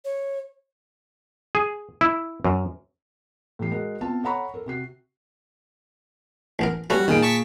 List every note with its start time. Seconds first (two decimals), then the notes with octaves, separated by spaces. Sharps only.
0.05 C#5
1.55 G#4
2.01 E4
2.45 F#2
3.59 A2 E3 G4 C7
3.71 G#3 F#4 G#4 A#4
4.01 B3 C4 F4 A5
4.23 A4 C#5 F#5 A#5 B5 C#6
4.54 A4 A#4
4.66 C3 F#4 C7
6.59 A1 B3 A#4
6.90 G3 A3 B3 C#4 F#4
7.08 A#2 D#3 G#4 D7
7.22 A5 C#6 B6